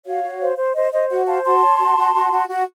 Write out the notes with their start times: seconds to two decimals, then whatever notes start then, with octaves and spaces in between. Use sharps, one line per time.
0.05 F#4 C#5 F5
0.23 F#4
0.41 C5
0.57 C5
0.75 C5 D#5
0.92 C5 D#5
1.10 F#4 D#5 F#5
1.27 C5 F5 A5
1.44 F#4 A5 C6
1.63 C#5
1.80 F#4
1.97 F#4
2.15 F#4
2.31 F#4
2.49 F#4